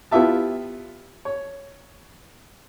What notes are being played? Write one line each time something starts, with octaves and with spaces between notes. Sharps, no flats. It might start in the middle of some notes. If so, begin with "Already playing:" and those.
B3 E4 F4 G4 E5 A5
C#5